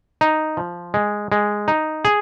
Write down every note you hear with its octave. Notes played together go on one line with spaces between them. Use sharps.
D#4
F3
G#3
G#3
D#4
G#4